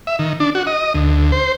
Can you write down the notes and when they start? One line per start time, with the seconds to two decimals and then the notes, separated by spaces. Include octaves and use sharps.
0.07 E5
0.19 D#3
0.40 D4
0.55 F#4
0.67 D#5
0.94 D2
1.32 C5